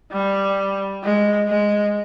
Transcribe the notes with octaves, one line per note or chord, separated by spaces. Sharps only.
G3
G#3
G#3